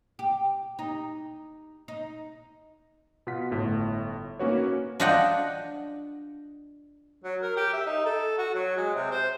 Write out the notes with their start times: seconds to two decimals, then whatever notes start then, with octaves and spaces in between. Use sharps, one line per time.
0.19 G4
0.79 D#4
1.88 D#4
3.27 B2 F4 F#5 B6
3.51 G1 A2
4.39 A#3 C#4 D#4 F#4 B4 C#5
5.00 D4 F4 D#5 F#5 G5
7.24 F#3
7.42 A#4
7.57 G4
7.73 E5
7.86 D#4
8.06 A4
8.38 F#4
8.54 F#3
8.77 G#3
8.95 C3
9.11 C5